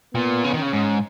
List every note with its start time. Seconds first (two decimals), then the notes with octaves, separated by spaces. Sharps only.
0.14 A#2 B3
0.44 C#3
0.53 D#3
0.58 C#3 C#4
0.73 G#2